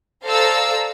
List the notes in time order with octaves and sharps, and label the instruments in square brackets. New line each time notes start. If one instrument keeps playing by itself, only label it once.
[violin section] A4 C5 D5 F5 A#5 E6